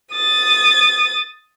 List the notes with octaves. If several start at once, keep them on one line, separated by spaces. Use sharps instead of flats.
D#6 A6